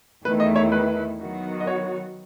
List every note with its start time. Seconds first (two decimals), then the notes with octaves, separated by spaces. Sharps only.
0.25 E2 D#3 A3 E4 B4
0.40 D#5
0.56 C#5
0.72 B4
1.19 D#3 F#3 B3 F#4
1.60 D#5
1.67 C#5